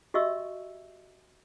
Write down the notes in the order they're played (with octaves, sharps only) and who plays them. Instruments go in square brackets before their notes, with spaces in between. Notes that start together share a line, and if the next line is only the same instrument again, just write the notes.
[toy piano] F#4 G4 D#5 E5 C#6 E6